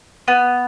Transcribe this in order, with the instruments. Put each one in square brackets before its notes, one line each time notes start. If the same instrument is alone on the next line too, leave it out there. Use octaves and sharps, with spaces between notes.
[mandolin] B3